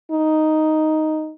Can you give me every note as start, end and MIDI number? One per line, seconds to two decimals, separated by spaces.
0.12 1.33 63